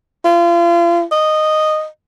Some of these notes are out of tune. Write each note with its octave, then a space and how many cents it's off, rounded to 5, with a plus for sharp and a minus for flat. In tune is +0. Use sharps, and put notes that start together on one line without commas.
F4 -35
D#5 -10